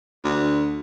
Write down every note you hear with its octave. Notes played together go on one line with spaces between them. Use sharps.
D2